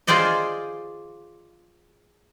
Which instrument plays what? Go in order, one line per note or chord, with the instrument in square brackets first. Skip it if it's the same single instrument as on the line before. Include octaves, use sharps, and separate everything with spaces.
[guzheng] F4 G#4 C5 D5 D#5